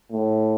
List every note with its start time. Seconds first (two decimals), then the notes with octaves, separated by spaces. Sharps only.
0.12 A2